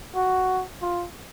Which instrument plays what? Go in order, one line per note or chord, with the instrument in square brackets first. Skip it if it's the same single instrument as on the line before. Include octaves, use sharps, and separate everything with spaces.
[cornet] F#4
F4